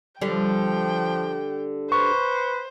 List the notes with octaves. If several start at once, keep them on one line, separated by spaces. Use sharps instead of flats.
D3 F3 G3 G5
B4 C5 C#6